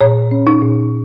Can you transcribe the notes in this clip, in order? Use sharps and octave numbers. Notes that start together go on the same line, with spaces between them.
A#2 C#5
C#4
D#4
A#2